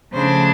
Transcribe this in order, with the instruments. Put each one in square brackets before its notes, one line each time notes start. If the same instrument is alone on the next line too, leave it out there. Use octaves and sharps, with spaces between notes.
[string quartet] C#3 F3 A3 D4 C5